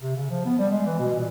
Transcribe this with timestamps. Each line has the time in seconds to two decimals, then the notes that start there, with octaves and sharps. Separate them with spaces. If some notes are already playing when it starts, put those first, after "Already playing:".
0.02 C3
0.16 C#3
0.30 F3
0.45 B3
0.58 G3
0.71 G#3
0.86 E3
0.99 B2
1.15 A#2